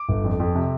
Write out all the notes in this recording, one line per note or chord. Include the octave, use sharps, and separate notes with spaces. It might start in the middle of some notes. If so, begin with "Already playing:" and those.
Already playing: D6
G1
F2
F2
C3